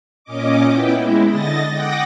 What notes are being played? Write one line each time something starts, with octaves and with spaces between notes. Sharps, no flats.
A#2 C#4 D#5 D6
B3 E4 G5
G#3 E4
D3 D#5 A6 A#6
F#5 G5 D6 D#6 A#6